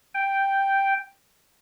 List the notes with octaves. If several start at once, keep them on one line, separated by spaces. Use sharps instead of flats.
G5